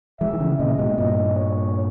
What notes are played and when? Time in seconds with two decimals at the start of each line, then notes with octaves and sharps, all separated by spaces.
0.20 E3 G#3 E5
0.33 D#3
0.40 C#3 E3
0.59 A#2 C#3 D#5
0.79 G#2 B2
0.98 G2 A#2 D#5
1.36 C#5